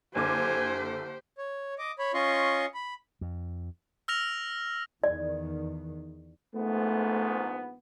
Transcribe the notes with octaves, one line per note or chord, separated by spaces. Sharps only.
F#1 D3 G4 C5 G#5 D6
C#5
D#5 D6
C#5 B5
C#4 F4 D#5 C6 C#6
B5
F2
E6 F6 A#6 F7
E2 D#3 D5
A#1 G#2 A3 B3